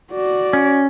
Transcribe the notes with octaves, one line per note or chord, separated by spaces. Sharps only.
F#4 D5
C#4